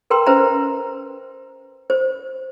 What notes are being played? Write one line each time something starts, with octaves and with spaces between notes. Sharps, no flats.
A#4 B4 G5 A#5 C6 E6
C#4 B4 C5 E5 A#5
C5